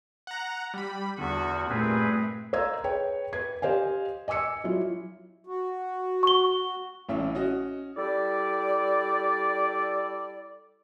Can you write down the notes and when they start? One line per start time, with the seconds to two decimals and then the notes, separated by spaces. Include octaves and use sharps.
0.27 F#5 A#5
0.74 G3 B5
1.18 E2 D3 F#4
1.69 G2 A#2 A3 C4 G#4 B4
2.53 C5 D#5 F5 A#5 E6 G#6
2.84 G#4 B4 C#5 G5
3.33 B4 G#6
3.62 G4 C5 D#5 F5 G#5
4.28 D#5 G#5 D6 E6 C#7
4.64 F#3 E4 F4
5.47 F#4
6.23 C#6 G7
7.09 A1 A2 C#4 E5
7.35 C#4 F#4 D#5 F#5
7.97 G3 E4 A4 D5